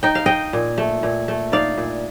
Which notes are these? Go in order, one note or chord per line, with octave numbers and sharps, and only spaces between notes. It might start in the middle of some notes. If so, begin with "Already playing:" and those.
D#4 G5
F5
D#4 D#5 G5
A#2
A3
A#2
A3
D#4 D5 F5
A#2